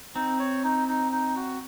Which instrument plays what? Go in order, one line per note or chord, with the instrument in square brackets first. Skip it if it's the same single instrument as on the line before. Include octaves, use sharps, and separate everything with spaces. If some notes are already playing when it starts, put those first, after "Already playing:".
[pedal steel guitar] C4 [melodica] D#4
[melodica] C#5
D#4
D#4
D#4
F#4